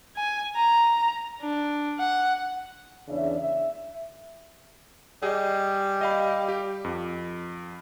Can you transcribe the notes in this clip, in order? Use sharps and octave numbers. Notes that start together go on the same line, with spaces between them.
G#5
A#5
D4
F#5
E2 C#3 D4 D5 E5
E5
G3 G#4 D#5
D#5 F5 B5
G4
F2